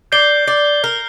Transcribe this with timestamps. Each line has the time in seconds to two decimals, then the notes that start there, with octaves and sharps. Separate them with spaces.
0.12 D5 G6 C7 G7
0.47 D5
0.84 A#4